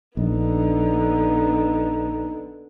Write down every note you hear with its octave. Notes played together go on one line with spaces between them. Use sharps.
A#1 D3 B3 D#4